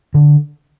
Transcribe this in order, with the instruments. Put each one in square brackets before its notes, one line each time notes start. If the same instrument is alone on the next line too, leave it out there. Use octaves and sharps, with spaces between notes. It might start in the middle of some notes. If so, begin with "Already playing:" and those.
[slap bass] D3